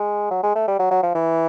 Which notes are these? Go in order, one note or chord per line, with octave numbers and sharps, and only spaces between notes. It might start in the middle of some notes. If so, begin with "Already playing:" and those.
Already playing: G#3
F#3
G#3
A3
G3
F#3
F#3
F3
E3